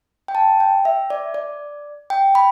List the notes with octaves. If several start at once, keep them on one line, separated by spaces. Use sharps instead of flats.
G5
A5
G5
E5
D5
D5
G5
B5